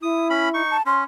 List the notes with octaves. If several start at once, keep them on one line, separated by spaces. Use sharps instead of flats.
E4 D#6
C#4 B5
D#4 C#6
A5
C#4 C6